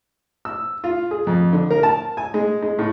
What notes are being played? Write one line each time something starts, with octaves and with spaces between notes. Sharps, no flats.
E6
F4
G#4
F2
D3
A#4
A5
G#5
G#3
G#3
A2